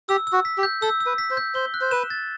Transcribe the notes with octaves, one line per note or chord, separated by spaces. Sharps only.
G4 E6
E6
F#4
B6
G4
G6
A4 E6
E6
B4
B6
C5
G6
C5 G7
F#6
C5
B4 E7
A6